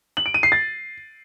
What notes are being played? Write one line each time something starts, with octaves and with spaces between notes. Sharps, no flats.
F#7
D7
D#7
C7
A6